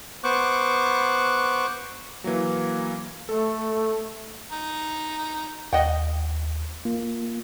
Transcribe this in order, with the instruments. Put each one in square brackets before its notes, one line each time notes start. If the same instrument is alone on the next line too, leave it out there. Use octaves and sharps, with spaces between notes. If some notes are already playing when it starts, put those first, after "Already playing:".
[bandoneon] B3 C5 C#6 D6 F#6
[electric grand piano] E3 F#3 [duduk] A#3
[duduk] A3 [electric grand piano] A4
[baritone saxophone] D#4
[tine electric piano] D#2 [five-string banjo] D#5 F#5 G5
[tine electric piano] A#3 F4